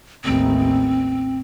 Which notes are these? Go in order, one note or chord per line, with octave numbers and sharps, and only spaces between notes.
A1 D#2 C4